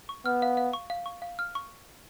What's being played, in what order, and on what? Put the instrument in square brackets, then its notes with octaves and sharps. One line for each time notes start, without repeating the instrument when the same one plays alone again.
[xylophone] C#6
[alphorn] B3 [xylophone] F6
[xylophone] F5
F5
C#6
F5
C#6
F5
F6
C#6